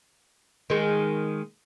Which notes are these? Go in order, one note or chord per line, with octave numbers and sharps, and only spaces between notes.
D#3 G#3